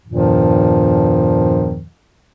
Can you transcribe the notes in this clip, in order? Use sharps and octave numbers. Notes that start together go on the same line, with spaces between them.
E2 G2 A#2 D#3 F3